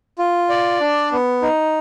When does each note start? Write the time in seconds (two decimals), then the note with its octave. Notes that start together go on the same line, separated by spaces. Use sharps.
0.19 F4
0.49 D5
0.80 D4
1.12 B3
1.42 D#4